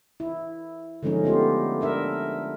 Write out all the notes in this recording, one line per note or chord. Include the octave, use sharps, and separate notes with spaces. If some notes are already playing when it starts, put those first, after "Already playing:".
E4
D3 F3 G#3 C#4 D#4
A3 B3 F4 G4
D4 A#4 E5